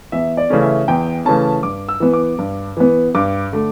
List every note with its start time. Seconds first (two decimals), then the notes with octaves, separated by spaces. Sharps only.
0.12 E2 E5
0.37 D5
0.50 C#3 E3 A3 C#4
0.62 E5
0.88 E2 G5
1.25 C#3 E3 A3 C#4 A5
1.63 G2 D6
1.89 E6
2.00 E3 B3
2.13 D6
2.39 G2
2.77 E3 B3
3.15 G2 D6
3.52 D3 A3